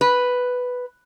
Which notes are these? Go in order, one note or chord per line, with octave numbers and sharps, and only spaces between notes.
B4